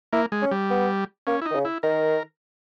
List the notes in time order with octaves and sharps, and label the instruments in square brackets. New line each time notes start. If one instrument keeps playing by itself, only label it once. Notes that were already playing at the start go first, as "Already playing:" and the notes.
[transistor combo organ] A#3 [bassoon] E4
[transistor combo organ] G#3
[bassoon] C#4
[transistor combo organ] G3
[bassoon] B3
[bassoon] A#3 [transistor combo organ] C#4
[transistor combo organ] E4
D#4
[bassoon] D#3
C#3
[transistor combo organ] E4
[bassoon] D#3 [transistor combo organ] A#4